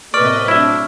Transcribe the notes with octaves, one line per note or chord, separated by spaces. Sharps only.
A2 C3 A#3 B4 D5 D#5 C#6 F6
F#3 D4 E4 E5